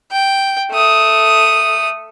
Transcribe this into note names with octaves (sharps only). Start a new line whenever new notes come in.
G5
A3 D#6